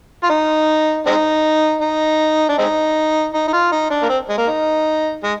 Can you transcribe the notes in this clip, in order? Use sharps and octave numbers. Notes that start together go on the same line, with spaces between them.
F4
D#4
G#3 C4 D#4
D#4
D4
G#3 C4 D#4
D#4
D#4
F4
D#4
D4
A#3
C4
G#3
A#3
D#4
G#3